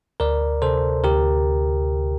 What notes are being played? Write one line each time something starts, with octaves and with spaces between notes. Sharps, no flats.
D2 A#4 D5
C3 A4 C5
D2 G4 A#4